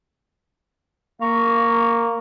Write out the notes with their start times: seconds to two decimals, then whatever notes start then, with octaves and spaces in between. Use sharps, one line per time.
1.21 A#3 F5 A#5 C#6